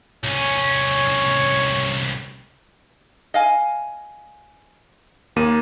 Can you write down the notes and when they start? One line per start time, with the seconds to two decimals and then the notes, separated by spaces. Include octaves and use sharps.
0.24 C2 C#4 C#5
3.34 D#5 F5 G#5
5.36 D#2 A#3 D#7